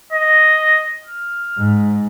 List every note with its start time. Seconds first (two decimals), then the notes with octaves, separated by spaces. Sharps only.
0.13 D#5
1.06 F6
1.58 G#2